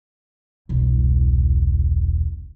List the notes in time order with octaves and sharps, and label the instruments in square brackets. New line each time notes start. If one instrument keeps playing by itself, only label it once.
[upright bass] E1 C2